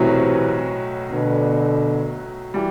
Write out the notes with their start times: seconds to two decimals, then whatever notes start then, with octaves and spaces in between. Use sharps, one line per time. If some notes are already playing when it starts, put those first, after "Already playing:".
Already playing: B1 A2 C3 E3 F#3 B3 F#4
1.12 B2 D3
2.54 E3 G3